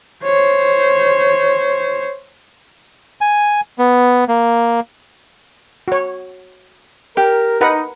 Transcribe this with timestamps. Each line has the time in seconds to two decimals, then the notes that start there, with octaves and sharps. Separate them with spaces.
0.24 C5 C#5
3.21 G#5
3.78 B3
4.28 A#3
5.88 F#4 C#5
7.17 G4 A#4
7.61 D#4 A#4 B4 F#5